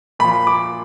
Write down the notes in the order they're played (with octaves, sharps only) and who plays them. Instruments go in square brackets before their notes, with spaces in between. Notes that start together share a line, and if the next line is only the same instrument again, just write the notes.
[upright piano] A#2 F3 B5
D6